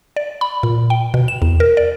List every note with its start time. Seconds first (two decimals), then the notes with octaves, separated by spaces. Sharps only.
0.16 D5
0.41 B5
0.63 A#2
0.90 G5
1.14 B2
1.28 E7
1.42 E2
1.60 A#4
1.77 D5